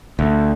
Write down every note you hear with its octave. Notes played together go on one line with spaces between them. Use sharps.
D2